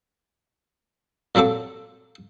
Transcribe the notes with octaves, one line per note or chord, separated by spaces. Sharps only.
A#2 F#3 C4 A4 D6